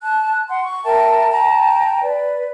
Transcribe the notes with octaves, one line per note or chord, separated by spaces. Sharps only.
A5 F#6
F#5 C6
C#6
A#4 E5 G5 A5
G5 A5 A#5
B4 D5